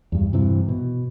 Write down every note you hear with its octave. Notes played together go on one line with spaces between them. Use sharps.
E2 G2
G2 C3 E3
B2